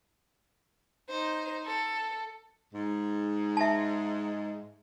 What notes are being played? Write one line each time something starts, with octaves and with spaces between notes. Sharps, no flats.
D#4 C5
A4
G#2
E5 A5